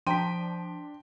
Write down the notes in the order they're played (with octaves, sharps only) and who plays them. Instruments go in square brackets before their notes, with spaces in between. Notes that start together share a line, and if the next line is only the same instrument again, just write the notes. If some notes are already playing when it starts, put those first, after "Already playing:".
[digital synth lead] F3 [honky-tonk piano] D4 [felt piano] G5 A#5 D#7 [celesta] C6 B6